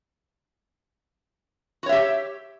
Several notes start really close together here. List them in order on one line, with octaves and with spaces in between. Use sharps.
F#4 C#5 E5 G4